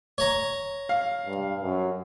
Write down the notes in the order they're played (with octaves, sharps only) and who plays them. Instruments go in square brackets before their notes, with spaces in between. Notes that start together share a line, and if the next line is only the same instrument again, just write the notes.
[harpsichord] C#5 A#5
[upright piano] F5
[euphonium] G2
F#2